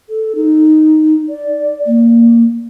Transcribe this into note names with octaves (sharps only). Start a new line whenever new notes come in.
A4
D#4
D5
A#3